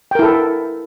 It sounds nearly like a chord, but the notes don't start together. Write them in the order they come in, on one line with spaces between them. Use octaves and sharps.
G5 A#4 E4 A4